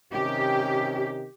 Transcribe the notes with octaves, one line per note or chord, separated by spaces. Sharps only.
C3 D#3 C#4 G4